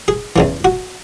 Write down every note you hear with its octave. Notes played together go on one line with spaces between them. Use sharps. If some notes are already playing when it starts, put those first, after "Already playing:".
G#4
E2 C#3 E3
F#4